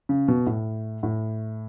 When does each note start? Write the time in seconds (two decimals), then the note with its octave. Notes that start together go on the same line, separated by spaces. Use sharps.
0.09 C#3
0.28 B2
0.47 A2
1.03 A2